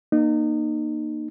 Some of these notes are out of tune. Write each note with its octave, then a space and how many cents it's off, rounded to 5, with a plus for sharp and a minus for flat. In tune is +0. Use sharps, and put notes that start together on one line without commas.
A#3 +10 D#4 -30